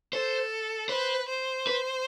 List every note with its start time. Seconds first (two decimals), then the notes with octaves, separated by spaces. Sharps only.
0.13 A4 C5
0.89 B4 C5
1.28 C5
1.67 B4